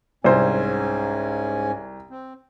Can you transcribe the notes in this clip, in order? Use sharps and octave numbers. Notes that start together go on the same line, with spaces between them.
C2 G#2 C#4 C5 G#5
C4